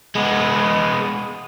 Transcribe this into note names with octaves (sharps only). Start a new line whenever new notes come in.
G#3 B3